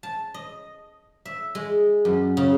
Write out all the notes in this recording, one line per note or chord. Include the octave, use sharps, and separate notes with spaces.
A5
D#5
E5
G#3
F#2
C#3